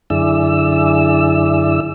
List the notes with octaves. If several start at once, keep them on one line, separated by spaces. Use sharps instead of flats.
F#2 D3 E4 G#4 D5 E6